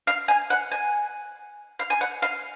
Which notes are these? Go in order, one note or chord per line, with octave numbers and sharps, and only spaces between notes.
F5
G#5
F#5
G#5
F5
G#5
F#5
F5